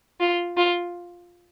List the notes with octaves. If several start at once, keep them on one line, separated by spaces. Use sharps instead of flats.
F4
F4